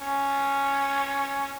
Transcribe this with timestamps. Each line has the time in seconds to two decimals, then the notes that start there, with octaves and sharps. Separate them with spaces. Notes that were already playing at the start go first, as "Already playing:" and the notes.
0.01 C#4